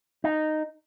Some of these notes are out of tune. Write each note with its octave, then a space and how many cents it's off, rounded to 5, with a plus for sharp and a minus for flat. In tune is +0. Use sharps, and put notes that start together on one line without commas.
D#4 -10